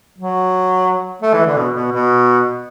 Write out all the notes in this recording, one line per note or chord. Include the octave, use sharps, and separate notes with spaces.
F#3
A3
E3
D3
B2
B2
B2